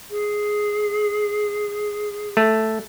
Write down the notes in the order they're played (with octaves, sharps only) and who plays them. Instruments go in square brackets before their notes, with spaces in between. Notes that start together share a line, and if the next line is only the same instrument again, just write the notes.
[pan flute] G#4
[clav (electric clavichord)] A3